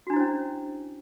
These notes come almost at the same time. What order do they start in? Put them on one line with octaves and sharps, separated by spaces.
F#4 D4 E4 C5 C#4